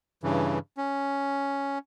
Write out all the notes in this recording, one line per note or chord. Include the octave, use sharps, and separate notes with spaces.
G2 C#3 E3
C#4